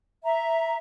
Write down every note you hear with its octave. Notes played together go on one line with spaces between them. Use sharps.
E5 A#5